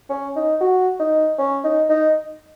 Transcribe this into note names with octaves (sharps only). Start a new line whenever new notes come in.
C#4
D#4
F#4
D#4
C#4
D#4
D#4